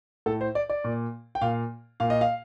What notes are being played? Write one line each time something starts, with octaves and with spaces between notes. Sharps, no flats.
A2 A4
C5
D5
D5
A#2
G5
A#2 F5
A#2 F5
D#5
F5